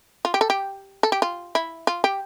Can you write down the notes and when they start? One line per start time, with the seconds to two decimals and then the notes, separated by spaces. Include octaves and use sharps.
0.25 F4
0.34 G4
0.41 A4
0.50 G4
1.03 A4
1.12 G4
1.22 F4
1.55 E4
1.87 F4
2.04 G4